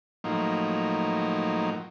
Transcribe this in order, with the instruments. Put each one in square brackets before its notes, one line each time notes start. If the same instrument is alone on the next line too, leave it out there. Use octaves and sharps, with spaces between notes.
[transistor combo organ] A2 F3 F#3 A#3 D#4